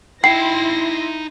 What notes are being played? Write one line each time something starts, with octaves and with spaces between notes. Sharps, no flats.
D#4 E4 G5 B5 C6 A#6 C7